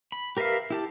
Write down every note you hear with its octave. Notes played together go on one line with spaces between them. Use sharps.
B5
G4 A#4 B4 E5 F5
E4 G4 A5